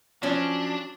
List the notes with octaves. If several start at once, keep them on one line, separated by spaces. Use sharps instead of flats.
F3 F#3 C#4 D4